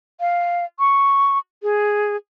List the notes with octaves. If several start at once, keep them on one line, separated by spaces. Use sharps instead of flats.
F5
C#6
G#4